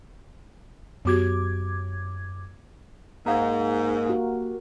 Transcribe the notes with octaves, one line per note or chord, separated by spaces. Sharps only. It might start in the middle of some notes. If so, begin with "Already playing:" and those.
F#2 B3 F#4 G4 D6 G#6
G#2 A#3 F5 F#5 A#5
F#4 G4 A#4